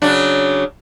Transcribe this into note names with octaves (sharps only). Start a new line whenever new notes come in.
C#3 F#3 D4